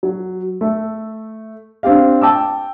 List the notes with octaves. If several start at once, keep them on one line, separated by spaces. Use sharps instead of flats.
F#3
A3
C4 D4 G4 F5
G5 A5 D6 E6